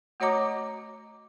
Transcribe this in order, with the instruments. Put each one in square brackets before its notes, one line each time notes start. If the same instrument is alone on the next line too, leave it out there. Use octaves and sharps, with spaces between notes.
[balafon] A3 F#4 C#5 D#5 A#5 D6